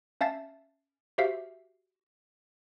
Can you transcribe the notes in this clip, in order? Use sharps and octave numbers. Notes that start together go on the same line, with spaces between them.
C#4 E5 F5 A5 A6
F#4 G4 C5 E5 F5